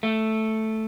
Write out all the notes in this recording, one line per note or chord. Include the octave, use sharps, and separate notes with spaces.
A3